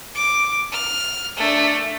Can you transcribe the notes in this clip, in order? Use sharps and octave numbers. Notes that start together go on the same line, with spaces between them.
D6
F6
A3 D4